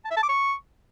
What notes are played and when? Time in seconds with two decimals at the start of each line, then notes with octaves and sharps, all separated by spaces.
0.05 A5
0.11 E5
0.17 A5
0.23 D6
0.29 C#6